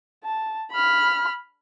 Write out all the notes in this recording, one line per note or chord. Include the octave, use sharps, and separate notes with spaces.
A5
B5 F6